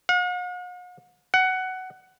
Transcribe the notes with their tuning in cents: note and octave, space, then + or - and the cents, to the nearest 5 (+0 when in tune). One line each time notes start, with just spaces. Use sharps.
F#5 -45
F#5 +15